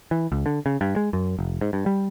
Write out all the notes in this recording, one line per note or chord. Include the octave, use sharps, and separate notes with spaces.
E3
C#2
D3
C#3
G2
G#3
F#2
F1
G#2
G2
G3